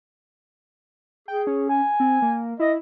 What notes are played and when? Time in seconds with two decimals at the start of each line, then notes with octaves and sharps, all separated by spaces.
1.28 G#4 G5
1.47 C#4
1.69 G#5
2.00 C4
2.22 A#3
2.59 E4 D#5